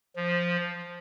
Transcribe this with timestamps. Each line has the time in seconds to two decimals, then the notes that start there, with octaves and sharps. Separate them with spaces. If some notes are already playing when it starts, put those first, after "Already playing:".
0.16 F3